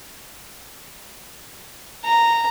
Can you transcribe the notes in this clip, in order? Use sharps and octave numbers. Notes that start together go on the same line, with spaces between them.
A#5